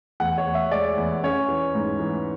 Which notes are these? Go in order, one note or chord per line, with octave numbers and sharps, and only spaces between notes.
E2 F#5
C#5
E2
E5
G#3 D5
E2
C#4 C#5
E3
G#2
E3